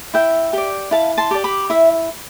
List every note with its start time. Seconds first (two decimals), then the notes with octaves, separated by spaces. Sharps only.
0.14 E4 E5 G5
0.53 G4 D5
0.91 E4 F5 A5
1.18 A5 C6
1.31 G4 D5
1.44 B5 D6
1.70 E4 E5